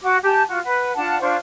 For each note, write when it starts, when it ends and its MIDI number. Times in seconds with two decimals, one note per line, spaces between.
0.02 0.15 66
0.02 0.15 86
0.23 0.42 67
0.23 0.42 80
0.23 0.42 81
0.48 0.58 65
0.48 0.58 66
0.64 0.92 71
0.64 0.92 78
0.95 1.20 62
0.95 1.20 65
0.95 1.20 78
0.95 1.20 81
1.20 1.35 62
1.20 1.35 65
1.20 1.35 72
1.20 1.35 85